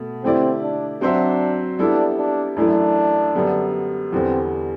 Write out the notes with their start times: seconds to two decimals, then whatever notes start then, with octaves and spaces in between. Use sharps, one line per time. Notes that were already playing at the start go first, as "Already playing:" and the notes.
Already playing: B2 A3
0.23 D3 A3 C4 E4 G4 D5
0.62 D4
1.01 F#3 C4 D4 F#4 C5 E5
1.79 G3 B3 D4 E4 A4 E5
2.18 D4
2.56 F#2 E3 A3 D4 E4
3.35 F#2 D3 G3 B3
4.12 E2 D3 G3 B3 C4